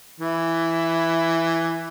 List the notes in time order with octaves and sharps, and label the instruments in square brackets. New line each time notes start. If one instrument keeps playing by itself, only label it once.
[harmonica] E3 E4